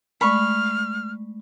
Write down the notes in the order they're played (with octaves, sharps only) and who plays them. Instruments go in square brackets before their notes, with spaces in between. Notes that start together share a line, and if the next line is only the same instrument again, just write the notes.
[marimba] G#3 A3 D5 [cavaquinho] B5 C#6 [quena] F6